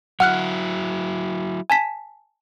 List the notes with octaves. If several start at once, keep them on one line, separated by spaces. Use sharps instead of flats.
F#3 E4 F#5 F6 F#6
G#5 A5 B6